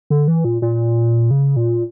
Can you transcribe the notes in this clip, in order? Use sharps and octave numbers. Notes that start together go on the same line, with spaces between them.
D3
E3
A#2
A#2
C#3
A#2